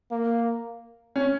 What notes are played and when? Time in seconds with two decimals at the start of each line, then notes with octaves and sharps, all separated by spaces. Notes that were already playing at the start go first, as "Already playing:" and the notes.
0.11 A#3
1.16 C#4